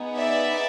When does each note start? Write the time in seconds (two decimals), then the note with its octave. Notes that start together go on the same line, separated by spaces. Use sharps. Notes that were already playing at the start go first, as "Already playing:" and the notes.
Already playing: B3 D#4 G#4
0.18 D5 E5